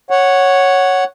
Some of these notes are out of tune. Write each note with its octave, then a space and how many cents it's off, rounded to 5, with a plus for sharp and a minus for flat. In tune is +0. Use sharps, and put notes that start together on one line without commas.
C#5 +0 F#5 +0